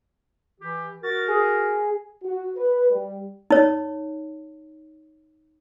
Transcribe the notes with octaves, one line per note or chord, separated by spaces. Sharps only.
E3 G4
F#4 A#4 A6
G#4
F#4
B4
G3
D#4 C#5